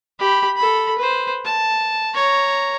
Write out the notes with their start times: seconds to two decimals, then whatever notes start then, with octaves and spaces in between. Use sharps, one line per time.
0.19 G4 B5
0.57 A4 B5
0.98 B4 C5
1.45 A5
2.14 C#5 A#5